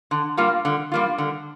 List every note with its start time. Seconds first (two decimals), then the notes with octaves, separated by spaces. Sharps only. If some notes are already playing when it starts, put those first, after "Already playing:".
0.11 D3
0.37 G3 A#3 F4
0.65 D3
0.92 G3 A#3 F4
1.18 D3